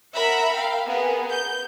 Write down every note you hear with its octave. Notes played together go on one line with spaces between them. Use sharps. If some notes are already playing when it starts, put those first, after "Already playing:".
A#4 E5 F#5 A#5 B5
F5 G5
B3 G#4 A#4
G6